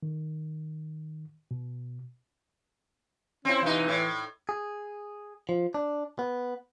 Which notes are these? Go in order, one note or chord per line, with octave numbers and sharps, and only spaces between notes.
D#3
B2
C4 C#4 E4
B2 E3 D#4
A2
G#4
F3
D4
B3